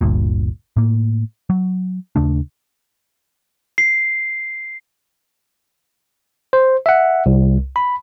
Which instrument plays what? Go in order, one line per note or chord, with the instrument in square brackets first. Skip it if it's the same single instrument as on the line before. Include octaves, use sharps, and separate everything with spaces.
[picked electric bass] G1 D2 G2 A#2
A2 A#3
F#3
D#2 C#3 A3 D4
[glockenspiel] C7
[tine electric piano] C5
E5 F#5
C2
B5